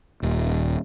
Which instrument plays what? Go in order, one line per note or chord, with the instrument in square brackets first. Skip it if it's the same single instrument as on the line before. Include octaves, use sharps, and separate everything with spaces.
[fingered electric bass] D#1